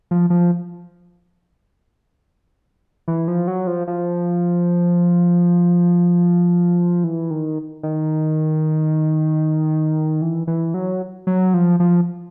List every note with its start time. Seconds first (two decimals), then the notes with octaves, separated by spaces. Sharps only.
0.11 F3
0.30 F3
3.08 E3
3.28 F3
3.48 F#3
3.67 F3
3.87 F3
7.04 E3
7.31 D#3
7.83 D#3
10.22 E3
10.47 E3
10.74 F#3
11.27 F#3
11.54 F3
11.80 F3